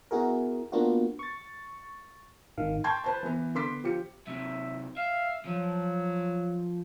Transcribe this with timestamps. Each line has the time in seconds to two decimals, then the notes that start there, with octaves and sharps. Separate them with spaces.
0.11 B3 E4 F#4 G#4 A#4
0.72 A#3 B3 D4 F4 F#4
1.19 C#6 A6
2.58 G#1 D#3 F5
2.84 G5 A5 C6 C#6 G6 G#6
3.04 B4 C5 A5
3.23 E3 B3
3.55 D3 B3 C6 D6 B6
3.84 F3 G4 C#7
4.27 C3 F#3 E5
4.97 E5 F5
5.45 F3 F#3